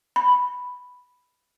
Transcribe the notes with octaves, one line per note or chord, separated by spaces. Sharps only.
B5